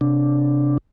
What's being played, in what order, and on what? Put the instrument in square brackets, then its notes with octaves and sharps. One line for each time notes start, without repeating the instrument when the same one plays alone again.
[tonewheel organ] C3 D4